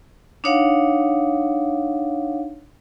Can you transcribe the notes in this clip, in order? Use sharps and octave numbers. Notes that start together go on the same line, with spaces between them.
D4 D#4 C#5 F5 F#5